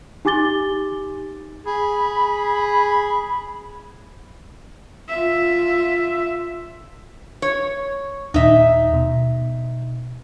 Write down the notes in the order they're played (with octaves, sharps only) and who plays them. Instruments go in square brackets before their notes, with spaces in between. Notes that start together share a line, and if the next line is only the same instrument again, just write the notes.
[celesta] D#4 G4 G#5 D6 A6 G7
[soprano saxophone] G#4 [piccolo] B5
[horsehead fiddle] F4 E5
[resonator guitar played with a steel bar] C#5
[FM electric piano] D#2 A#2 [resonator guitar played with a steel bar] D#4 E5
[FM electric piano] B2